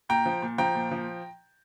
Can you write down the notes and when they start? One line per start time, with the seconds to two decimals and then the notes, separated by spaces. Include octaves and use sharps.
0.09 A#2 G5 A#5
0.26 F3
0.42 A#2
0.58 F3 G5 A#5
0.75 A#2
0.91 F3